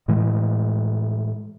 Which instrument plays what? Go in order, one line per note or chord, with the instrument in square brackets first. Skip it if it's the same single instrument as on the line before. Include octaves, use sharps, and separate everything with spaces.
[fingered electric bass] A2 E3 G#3